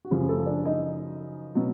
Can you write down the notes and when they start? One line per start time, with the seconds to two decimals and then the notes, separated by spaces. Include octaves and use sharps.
0.05 F#4
0.10 F#2 C#3 F3 G3 G4
0.29 A3 A4
0.46 D4 D5
0.65 D#4 D#5
1.55 B2 F#3